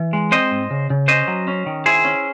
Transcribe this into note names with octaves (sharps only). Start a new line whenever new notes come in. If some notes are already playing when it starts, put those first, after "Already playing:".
Already playing: E3
G#3
C4 C5 D#5
G#2
C#3
C#3
C#4 C5 D#5
F#3
C#4
D#3
E4 G#4 C5
C#4